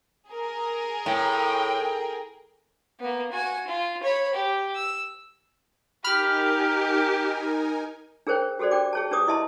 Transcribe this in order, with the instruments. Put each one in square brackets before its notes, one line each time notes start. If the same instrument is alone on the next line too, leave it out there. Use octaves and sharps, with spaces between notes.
[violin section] G#4 A#4
[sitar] A2 [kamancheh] G5
[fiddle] A#3 B3
F#4 G#5
F4
C#5 B5
G4
E6
[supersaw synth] D#4 A#4 G#5 [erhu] G4 [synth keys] B5 F6
[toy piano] D4 G#4 A#4 C5 C#5 G5
F#4 G4 A4 C5 D5
D4 G5 D6
G#4 C#5 A5
D4 G4 B4 C#5 D6 D#6
E4 D#5 E5 A5 C6